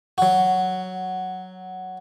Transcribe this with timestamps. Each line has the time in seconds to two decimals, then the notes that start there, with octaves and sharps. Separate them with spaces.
0.18 F#3 F#4